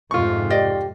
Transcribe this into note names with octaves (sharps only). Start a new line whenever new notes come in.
F2 G#2 C3 F4 C#6
G4 D5 D#5